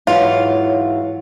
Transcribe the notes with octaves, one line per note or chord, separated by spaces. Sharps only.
G#2 E3 F#3 F4 C#5